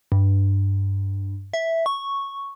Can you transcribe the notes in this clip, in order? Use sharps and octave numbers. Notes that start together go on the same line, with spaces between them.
G2
E5
C#6